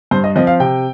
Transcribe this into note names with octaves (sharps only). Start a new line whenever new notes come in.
G2 C5
D#5
F3 C4 D#5
F5
C3 G5